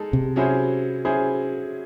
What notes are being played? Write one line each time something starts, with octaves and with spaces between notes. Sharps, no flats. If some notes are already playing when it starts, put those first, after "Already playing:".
Already playing: G#3 D#4 A4
C3
F#3 C#4 E4 G#4 C5
F#3 C#4 E4 G#4 C5